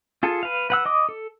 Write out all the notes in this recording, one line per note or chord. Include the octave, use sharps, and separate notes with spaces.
F4 G#4 A4
B4 F5
B4 F#5 E6
D#5 D6 D#6
A4